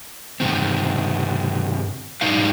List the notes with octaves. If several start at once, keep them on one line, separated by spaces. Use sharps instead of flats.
G2 C3 D#3 C4
G#2 F#3 D4 D#4 B4 F5